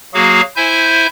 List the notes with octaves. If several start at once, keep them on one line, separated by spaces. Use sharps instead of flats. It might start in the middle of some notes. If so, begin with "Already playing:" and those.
F#3 A#3 F#4 G#4 F5
E4 C5 E5 G#5 G6